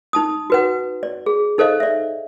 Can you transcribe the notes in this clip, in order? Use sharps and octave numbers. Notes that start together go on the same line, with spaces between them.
D#4 A5 D#6
F#4 B4 F#5
D5
G#4
D#4 A4 C5 D#5 F5
D5 E5